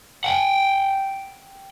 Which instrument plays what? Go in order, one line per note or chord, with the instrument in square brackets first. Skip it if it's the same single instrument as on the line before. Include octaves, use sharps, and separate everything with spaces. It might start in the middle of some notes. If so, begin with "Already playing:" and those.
[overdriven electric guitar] F#5 G5